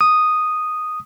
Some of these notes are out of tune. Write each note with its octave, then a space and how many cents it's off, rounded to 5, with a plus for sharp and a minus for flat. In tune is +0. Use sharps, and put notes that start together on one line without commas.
D#6 -5